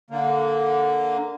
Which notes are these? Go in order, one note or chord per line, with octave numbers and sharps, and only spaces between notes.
D3 A#3